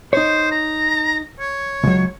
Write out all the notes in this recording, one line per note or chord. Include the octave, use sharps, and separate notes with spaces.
D#4 C5 C#5
A#5
C#5
C#2 F#3